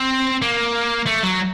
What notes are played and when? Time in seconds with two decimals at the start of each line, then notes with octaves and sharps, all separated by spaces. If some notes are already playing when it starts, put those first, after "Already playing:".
Already playing: C4
0.42 A#3
1.07 A3
1.24 F#3